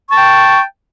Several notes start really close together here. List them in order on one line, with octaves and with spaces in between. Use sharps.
C#6 A5 G5